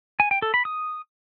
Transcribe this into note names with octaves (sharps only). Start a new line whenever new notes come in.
G#5
G5
A4
B5
D#6